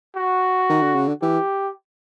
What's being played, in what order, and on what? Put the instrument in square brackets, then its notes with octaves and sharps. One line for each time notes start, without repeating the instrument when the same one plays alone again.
[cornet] F#4
[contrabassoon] D#3
D3
C#3
D3
[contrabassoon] E3 [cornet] G4